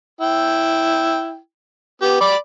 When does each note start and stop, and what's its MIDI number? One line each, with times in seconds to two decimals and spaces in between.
0.21 1.38 64
0.21 1.38 79
2.02 2.16 59
2.02 2.16 67
2.21 2.36 74
2.21 2.36 83
2.21 2.36 86